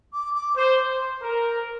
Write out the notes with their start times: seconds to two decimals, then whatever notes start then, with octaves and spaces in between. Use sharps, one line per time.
0.13 D6
0.35 D6
0.57 C5
1.21 A#4